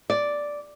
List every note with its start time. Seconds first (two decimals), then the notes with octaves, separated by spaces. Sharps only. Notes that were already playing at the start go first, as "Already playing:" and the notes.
0.10 D5